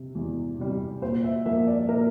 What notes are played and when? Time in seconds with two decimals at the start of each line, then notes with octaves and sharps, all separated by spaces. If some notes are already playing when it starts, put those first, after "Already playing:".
Already playing: C3
0.15 E2
0.59 C3 G3
1.02 A#2 C5
1.24 E5
1.46 F3 A#3 E5
1.67 D5
1.89 A#2 A#4